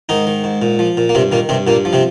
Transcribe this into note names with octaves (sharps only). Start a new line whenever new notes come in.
G#2 D#3 D#4
D#3
G#2
A#2
F3
A#2
A#3
G2 C3 C4
A#2 D#3 A#3
G2 C3 C4
G2 A#2 A#3
F3
C3 C4